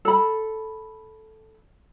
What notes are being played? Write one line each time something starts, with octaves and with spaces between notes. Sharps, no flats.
A4 B5